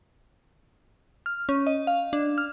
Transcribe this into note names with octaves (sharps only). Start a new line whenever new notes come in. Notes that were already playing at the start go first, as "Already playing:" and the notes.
F6
C#4
D#5
F5
D4
F6